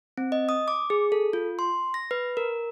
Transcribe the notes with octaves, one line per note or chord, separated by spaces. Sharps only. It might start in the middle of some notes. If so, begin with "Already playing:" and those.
C4
D#5
D#6
D6
G#4
A4
F4
C6
A#6
B4
A#4